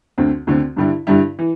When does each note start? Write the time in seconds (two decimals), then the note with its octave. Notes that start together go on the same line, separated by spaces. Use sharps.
0.18 D2 D3 C4
0.47 D2 D3 C4
0.76 G2 D3 G3 E4
1.07 G2 D3 G3 E4
1.39 E3